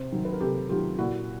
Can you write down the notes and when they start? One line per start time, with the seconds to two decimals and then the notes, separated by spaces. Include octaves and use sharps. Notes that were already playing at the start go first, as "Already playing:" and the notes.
Already playing: C3 C5
0.12 D#3 F#3
0.25 B4
0.33 A#4
0.41 C3 G4 A4
0.69 D#3 F#3 F4 G4
0.98 A#2 E4 F#4